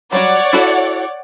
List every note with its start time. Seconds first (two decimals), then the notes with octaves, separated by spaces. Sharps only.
0.12 F#3 G3 F#4 C#5 D5 F#5
0.53 E4 F#4 A4